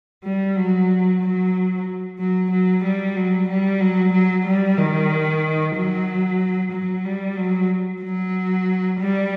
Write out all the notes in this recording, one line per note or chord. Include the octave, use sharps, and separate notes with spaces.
G3
F#3
F#3
F#3
F#3
G3
F#3
G3
F#3
F#3
G3
D#3
F#3
F#3
G3
F#3
F#3
G3